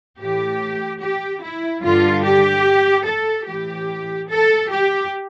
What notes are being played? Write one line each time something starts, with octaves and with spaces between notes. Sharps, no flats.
A2 E3 G4
G4
E4
G2 D3 F4
G4
A4
A2 E3 G4
A4
G4